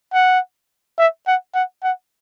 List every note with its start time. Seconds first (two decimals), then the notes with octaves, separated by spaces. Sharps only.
0.13 F#5
0.98 E5
1.27 F#5
1.55 F#5
1.83 F#5